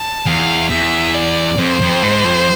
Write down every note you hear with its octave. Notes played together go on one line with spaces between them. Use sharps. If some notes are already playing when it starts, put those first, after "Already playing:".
Already playing: A5
E2 F5
E2 E5
D5
F2 C5
F2
G#2
F2